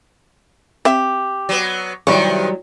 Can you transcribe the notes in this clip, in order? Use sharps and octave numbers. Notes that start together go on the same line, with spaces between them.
C4 G4 E5
F#3 B3
C3 D#3 F#3 G3 B3 E4 C#5 C#6